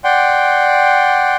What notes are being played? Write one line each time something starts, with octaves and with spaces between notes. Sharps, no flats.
D5 F#5 G5 C6